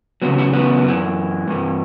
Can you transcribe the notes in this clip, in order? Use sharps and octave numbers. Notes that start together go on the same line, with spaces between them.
E2 C#3 F#3 B3
B3
B3
F#2 E3
G2 E3